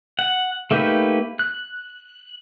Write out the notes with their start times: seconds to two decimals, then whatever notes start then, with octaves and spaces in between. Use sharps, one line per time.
0.19 F#5
0.71 A3 A#3 D#4 G4 B4
1.39 F#6